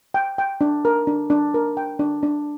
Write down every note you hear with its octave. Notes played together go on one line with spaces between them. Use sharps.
G5
G5
D4
A#4
D4
D4
A#4
G5
D4
D4